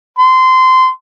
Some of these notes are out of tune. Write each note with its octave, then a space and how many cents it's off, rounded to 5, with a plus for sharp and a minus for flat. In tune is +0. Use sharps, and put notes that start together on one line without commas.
C6 -20